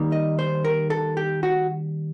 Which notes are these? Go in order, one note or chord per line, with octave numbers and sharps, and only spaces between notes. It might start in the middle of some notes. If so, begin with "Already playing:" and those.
Already playing: D#3 G3 A#3 D#4
D#5
C5
A#4
A4
G4
F#4